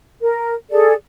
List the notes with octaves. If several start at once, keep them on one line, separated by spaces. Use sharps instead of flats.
A#4
G#4 A4 D5